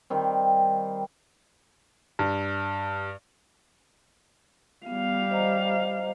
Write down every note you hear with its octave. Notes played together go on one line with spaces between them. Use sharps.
D#3 G3 C4
G2
G3 B3 F5
C5 D#5 A#5